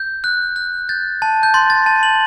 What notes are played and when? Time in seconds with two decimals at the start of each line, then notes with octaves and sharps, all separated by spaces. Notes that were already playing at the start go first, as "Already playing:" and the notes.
Already playing: G6
0.24 F#6
0.56 F#6
0.89 G6 A6
1.22 A5
1.43 G6
1.54 C6 A6
1.70 A6
1.86 A5
2.03 F#7